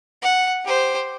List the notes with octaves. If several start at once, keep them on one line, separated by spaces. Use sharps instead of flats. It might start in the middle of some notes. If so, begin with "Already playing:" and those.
F#5
G4 C5